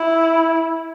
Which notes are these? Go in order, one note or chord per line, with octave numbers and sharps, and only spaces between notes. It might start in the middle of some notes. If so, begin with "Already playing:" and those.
Already playing: E4